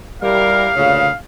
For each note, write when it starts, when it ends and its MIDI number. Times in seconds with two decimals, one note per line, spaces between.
0.22 0.68 55
0.22 0.70 64
0.22 0.70 67
0.22 0.70 70
0.22 1.16 77
0.76 1.09 38
0.76 1.09 46
0.76 1.09 49